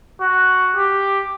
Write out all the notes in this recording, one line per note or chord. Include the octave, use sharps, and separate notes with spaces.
F#4
G4